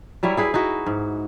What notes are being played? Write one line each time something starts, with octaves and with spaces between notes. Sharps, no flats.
F#3 G3 E4 C#5
E4 G#4 B4
D#4 E4 F#4
G#2